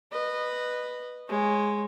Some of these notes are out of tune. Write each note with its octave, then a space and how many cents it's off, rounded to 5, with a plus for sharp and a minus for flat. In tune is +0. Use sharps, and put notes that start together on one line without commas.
B4 +0 D#5 -20
G#3 +0 C#5 -30